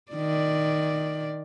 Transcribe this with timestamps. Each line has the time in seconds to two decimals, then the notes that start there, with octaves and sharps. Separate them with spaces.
0.12 D#3 D5